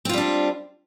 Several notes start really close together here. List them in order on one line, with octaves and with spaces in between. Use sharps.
C4 F4 G3 D4